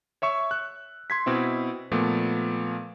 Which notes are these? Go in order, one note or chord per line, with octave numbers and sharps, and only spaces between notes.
C#5 E5 C#6 E6
F#6
C6 G#6 B6
B2 C4 E4
A#2 F3 A3 B3